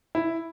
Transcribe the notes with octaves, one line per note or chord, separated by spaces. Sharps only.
E4